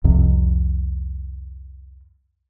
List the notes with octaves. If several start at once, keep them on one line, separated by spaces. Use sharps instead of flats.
C2 F2 C3